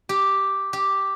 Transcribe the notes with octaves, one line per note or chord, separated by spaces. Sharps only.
G4
G4